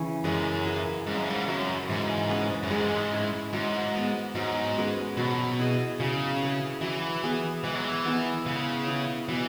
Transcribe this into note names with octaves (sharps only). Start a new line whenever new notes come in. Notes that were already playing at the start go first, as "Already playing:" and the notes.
Already playing: C#3 E3 C#4
F#2 G#3
E4 G#4 B4
G#2 C#3
F#2
G#2
F#2 F#3 C#4
G#2 E3
C#4 G#4 B4
F#2
G#2 G#3
C#4 E4
G#2 F#3
B3 G#4 B4
G#2 F#3
C#4 G#4 B4
B2 F#3
E4 G#4
C#3 F#3
E4 G#4 B4
E3 F#3
B3 G#4 B4
E3 G#3
F#3
E3
B3 E4
C#3 G#3
E4 G#4 B4
B2 E3